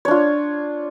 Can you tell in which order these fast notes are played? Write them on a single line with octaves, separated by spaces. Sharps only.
C#5 D4 F4